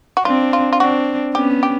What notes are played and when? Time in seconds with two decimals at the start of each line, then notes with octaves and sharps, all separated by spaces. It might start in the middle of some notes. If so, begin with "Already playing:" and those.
0.17 F#4
0.25 C4 D4 F4
0.53 F4
0.73 F4
0.80 C4 D4 F#4
1.34 B3 C#4 G4
1.63 G4